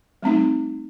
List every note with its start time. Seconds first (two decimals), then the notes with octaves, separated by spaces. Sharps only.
0.22 G3 A3 C4 D#4